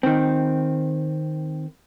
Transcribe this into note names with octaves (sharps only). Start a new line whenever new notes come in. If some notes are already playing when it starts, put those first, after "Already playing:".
D#3 C4